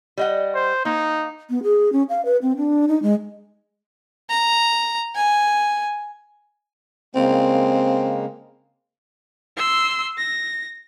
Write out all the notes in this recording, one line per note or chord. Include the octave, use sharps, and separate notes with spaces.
G3 D#5 F#5
C5
A#3 D#4
B3
G#4
C#4
F5
B4
C4
D4
D#4
G#3
A#5
G#5
C#3 G#3 A#3 C4
C6 E6
A#6